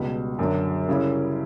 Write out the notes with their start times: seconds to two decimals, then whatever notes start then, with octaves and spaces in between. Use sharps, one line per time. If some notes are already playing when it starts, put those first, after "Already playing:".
Already playing: C#2 B2 G3
0.39 F#2 D3 F#3
0.88 C#3 G3 C#4 E4